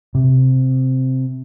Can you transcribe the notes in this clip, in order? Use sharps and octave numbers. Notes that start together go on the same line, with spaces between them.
C3